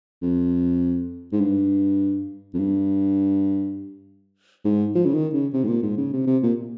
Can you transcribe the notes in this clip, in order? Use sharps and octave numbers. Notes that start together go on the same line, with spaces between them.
F2
G#2
G2
F2
G2
G#2
F3
C#3
D#3
C#3
C3
G#2
A#2
G#2
C#3
C3
C3
A#2